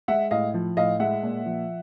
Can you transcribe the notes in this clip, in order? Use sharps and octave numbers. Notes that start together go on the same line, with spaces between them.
G#3 E5 F#5
A2 D#5 F5
F3
A2 D#5 F5
G#3 E5 F#5
A#2
F3